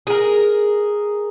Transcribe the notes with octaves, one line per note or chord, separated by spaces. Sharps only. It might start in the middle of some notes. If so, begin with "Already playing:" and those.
G#4 A#4